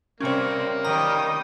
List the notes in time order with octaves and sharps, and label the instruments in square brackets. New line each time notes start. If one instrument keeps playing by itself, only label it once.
[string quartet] C3 G3 C4 [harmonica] A#3 [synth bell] C#4 C#5
[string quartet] D#3 G3 [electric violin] G5 D#6 [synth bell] A#5